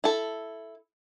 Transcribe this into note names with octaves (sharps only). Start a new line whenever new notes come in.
E4 A4